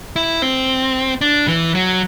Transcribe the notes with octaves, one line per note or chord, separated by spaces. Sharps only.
E4
C4
D4
E3
F#3